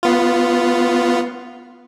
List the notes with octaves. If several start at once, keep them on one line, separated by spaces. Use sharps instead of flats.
B3 F4